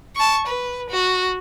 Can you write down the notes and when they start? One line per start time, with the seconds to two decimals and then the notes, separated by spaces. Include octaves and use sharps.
0.16 A5 C#6
0.47 B4
0.90 F#4